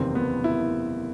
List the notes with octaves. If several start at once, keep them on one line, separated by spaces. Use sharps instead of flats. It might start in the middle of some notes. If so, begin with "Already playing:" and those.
Already playing: F#1 E2 C3 D#3 C4
B3
E4